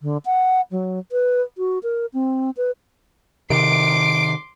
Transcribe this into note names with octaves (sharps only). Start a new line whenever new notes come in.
D3
F#5
F#3
B4
F#4
A#4
C4
B4
C3 D#3 C6 D6 D7